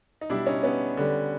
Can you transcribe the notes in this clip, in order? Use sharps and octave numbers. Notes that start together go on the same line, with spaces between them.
D#4
B2 G3 D4 E4
C#4 D#4
B3 C#4
D3 G3